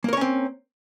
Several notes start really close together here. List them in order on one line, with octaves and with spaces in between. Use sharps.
A#3 A#4 C#5 C#4 C4